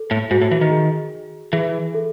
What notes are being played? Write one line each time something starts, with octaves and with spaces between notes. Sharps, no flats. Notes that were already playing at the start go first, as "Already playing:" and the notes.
Already playing: A4
A2
G#2 F#4
A2
E3
D#3
G#4
E3 G#4
A4